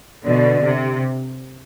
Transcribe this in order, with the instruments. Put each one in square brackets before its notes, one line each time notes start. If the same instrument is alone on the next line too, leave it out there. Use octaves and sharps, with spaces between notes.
[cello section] B2 D3 [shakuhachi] D5
[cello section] C3